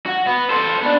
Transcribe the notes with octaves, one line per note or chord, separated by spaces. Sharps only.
F#4
B3
A4 C5
B3 D4